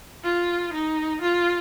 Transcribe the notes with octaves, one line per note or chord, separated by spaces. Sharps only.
F4
D#4
F4